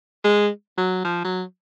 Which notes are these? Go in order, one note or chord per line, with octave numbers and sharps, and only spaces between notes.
G#3
F#3
F3
F#3